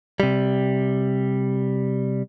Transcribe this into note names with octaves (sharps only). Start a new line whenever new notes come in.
C3 G3